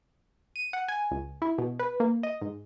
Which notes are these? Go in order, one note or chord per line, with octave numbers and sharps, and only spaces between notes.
D#7
F#5
G#5
C#2
E4
B2
B4
A#3
D#5
G#2